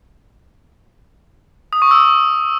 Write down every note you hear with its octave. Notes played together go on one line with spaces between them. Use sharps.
D#6
C#6
E6